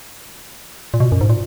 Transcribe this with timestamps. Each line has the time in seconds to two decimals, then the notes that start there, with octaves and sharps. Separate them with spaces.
0.94 A#2
1.00 B2
1.12 F#2
1.21 G#2
1.30 A#2